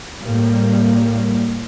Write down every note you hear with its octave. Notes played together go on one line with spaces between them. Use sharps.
A2 G3 A#3